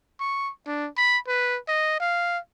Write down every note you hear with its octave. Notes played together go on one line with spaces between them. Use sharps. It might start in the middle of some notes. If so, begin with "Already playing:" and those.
C#6
D4
B5
B4
D#5
F5